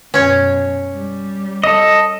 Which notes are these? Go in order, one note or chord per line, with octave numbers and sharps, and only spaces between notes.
F#2 B2 C#4 C#5
G3
A4 D#5